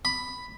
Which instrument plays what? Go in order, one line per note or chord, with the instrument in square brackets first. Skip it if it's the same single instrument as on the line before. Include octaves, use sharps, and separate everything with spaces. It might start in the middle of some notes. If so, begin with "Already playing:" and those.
[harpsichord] B5